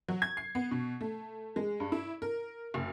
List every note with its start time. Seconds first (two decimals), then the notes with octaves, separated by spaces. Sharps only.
0.08 F#3
0.22 G#6
0.37 C7
0.55 B3
0.71 B2
1.01 A3
1.56 G#3
1.80 G2
1.92 E4
2.22 A#4
2.74 F#1